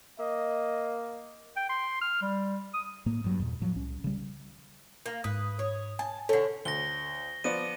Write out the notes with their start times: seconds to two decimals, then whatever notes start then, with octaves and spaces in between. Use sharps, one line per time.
0.19 A#3 D#5
1.57 G5
1.70 C6
2.02 F6
2.22 G3
2.74 D#6
3.06 A2 A#3
3.24 G2 F#3
3.40 E2 A#2
3.61 A2 F3 F#3
3.76 C2 C#4
4.04 C#3 G3
5.06 A#3
5.24 G#2 B4 D#6
5.59 C#5
5.99 G#5 A5
6.29 D3 C#4 A4
6.65 D2 A#6 G7
7.44 F3 B3 D5 D#7